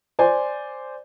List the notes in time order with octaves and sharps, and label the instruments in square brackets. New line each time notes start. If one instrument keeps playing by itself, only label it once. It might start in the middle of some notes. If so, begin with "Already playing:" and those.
[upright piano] C5 D5 G#5